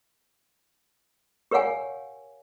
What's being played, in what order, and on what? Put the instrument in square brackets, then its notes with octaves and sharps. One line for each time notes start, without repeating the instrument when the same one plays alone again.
[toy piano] G4 A#4 C#5 F5 F#5 G#5